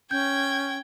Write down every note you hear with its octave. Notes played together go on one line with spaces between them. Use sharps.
C#4 G5 G6 G#6